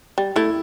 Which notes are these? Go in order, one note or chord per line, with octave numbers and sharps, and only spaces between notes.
G3
A3 E4